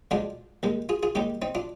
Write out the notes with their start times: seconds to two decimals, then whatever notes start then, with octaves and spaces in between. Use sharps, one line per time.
0.11 D2 D3 F3 G#3 D4 F4
0.63 D#2 D#3 G#3
0.89 F4 G#4
1.03 F4 G#4
1.15 D#2 D#3 G#3 D#4 G4
1.42 C4 D#4
1.55 D4 F4